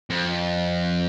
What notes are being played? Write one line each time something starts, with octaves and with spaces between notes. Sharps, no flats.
F2